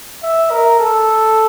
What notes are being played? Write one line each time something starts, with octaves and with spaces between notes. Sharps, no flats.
E5
A#4
A4